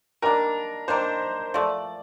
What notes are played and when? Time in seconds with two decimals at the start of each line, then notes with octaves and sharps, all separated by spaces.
0.22 D#3 G3 A#3 D4 A#4
0.88 D#3 G3 A#3 D4 C5
1.54 F3 A3 D5